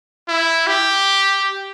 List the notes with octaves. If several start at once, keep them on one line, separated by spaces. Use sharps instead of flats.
E4
G4